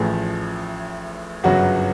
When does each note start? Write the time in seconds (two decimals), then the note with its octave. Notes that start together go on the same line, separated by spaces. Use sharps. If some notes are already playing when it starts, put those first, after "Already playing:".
Already playing: A1 A2 F3 G#4
1.44 G1 F#2 C#3 F#3 F#4